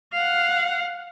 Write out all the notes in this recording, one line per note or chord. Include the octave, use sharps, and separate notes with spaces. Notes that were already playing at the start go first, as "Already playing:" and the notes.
F5 F#5